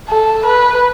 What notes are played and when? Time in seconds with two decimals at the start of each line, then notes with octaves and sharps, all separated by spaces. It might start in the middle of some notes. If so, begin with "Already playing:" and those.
0.09 A4
0.46 B4